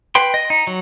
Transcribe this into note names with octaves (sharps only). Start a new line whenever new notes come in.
B4 G5 C6
D#5
D#4
F#3